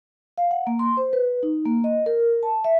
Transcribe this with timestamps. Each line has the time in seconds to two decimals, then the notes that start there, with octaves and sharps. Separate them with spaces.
0.38 F5
0.51 F#5
0.67 A#3
0.79 C6
0.97 C5
1.13 B4
1.43 D#4
1.66 A#3
1.84 D#5
2.06 A#4
2.43 A5
2.64 E5